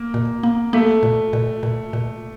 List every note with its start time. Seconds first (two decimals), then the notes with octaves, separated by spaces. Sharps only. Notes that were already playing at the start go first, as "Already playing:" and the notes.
Already playing: A#3
0.14 A#2
0.43 A#3
0.73 A3 A#3
1.03 A#2
1.33 A#2
1.63 A#2
1.93 A#2